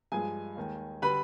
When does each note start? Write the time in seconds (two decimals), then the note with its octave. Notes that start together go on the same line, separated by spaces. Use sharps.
0.12 G2 F3 G#3 G#4 G#5
0.57 D#2 D#3 G#3
1.02 D3 G3 B4 B5